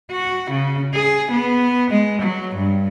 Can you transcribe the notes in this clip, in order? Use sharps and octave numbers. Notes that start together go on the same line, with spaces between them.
F#4
C#3
G#4
B3
G#3
F#3
G2